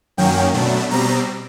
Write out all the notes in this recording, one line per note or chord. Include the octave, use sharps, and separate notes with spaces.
F#2 D#3 F#3 A#3 C#4 G5
B2 F#3 A3 D4
B2 G3 C4 A#5